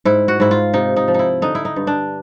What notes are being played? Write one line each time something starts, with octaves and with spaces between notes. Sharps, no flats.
G#2 E4
F#4
G#2 E4
F4
C3 D#4
D#4
F3
D#4 E4
D3 D#4
E4
D#4
G2
D4